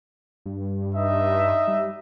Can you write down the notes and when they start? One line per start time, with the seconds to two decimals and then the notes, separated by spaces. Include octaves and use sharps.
0.46 G2
0.95 D#4 D#5 E5
1.68 G3